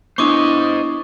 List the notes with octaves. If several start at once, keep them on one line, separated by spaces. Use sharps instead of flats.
B3 D4 E4 C5 D#5 C#6 D6